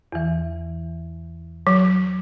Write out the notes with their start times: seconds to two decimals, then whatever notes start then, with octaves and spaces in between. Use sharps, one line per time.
0.12 E2 E3
1.67 F#3